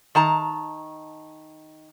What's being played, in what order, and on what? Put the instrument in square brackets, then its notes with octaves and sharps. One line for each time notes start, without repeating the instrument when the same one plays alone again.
[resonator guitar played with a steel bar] D#3 A5 A#5